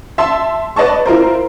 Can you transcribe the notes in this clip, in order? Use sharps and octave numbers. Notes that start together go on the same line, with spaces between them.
E5 A5 C6
B4 D5 D#5 A5 C#6
E4 F4 A#4 C5